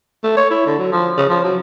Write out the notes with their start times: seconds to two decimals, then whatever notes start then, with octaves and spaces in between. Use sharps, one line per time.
0.24 A3
0.37 C#5
0.50 E4
0.66 D3
0.79 F#3
0.92 F3
1.17 C#3
1.30 F3
1.44 F#3